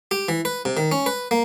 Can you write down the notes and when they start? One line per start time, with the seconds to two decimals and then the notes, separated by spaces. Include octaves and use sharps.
0.11 G4
0.28 E3
0.45 B4
0.65 C3
0.77 D#3
0.92 C#4
1.06 B4
1.31 A#3